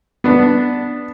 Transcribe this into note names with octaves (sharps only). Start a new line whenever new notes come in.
B3 D4